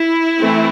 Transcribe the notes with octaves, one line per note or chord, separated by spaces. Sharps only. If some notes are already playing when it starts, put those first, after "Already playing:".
Already playing: E4
E3 A3 C4